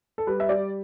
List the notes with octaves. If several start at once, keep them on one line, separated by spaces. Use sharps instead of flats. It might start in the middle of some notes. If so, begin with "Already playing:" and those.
A4
G3 B4
E5
G3 D5